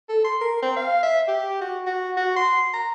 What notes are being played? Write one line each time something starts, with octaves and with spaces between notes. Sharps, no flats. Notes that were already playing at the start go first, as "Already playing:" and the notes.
A4
C6
A#4
C4
F5
E5
G4
F#4
F#4
F#4
C6
A#5